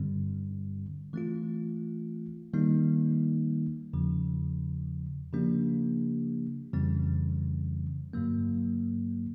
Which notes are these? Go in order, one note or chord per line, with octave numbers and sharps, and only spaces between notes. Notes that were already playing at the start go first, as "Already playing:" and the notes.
Already playing: G2 D3 G3 C4
E3 A3 C4 F4
D#3 G3 A#3 D#4
E2 C#3 F3
C#3 F3 A#3 D4 G4
F2 C#3 E3 G3 C4
G2 D3 F#3 A#3